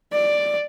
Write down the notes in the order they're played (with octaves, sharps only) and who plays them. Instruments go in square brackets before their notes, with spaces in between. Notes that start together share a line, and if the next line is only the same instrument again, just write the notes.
[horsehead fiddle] D5